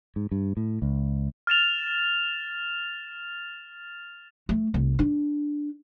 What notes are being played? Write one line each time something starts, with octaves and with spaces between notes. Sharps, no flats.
G#2
G2
A2
C#2
F6 A6 E7 F7
A3
C2
D4